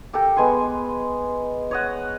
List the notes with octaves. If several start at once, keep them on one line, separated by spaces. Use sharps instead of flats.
G4 A4 A#4 G5
G#3 B3 G#5 C6
C#5 D#5 F#5